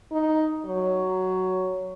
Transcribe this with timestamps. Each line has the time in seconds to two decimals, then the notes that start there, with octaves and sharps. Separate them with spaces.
0.12 D#4
0.65 F#3